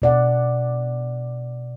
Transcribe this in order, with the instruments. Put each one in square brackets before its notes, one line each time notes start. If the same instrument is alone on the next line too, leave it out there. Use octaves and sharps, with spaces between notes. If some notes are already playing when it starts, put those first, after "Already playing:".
[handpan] B2 D5 F#5